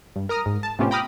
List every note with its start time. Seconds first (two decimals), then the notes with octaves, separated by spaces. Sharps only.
0.16 G2
0.29 A#4 A#5 D#6 F6
0.46 G#2
0.63 A5
0.79 A2 C3 B3 C#4 F4 G4
0.91 G5 A#5 B5 D6 D#6 F6